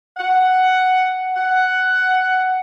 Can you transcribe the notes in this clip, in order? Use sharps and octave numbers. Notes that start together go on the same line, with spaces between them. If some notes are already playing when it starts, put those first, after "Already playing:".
F#5
F#5